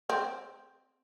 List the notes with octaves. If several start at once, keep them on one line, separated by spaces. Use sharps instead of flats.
C4